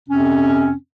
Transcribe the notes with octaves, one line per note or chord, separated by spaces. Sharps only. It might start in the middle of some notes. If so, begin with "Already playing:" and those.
F2 C3 C4 C#4